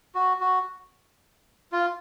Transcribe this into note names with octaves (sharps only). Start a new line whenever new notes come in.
F#4
F#4
F4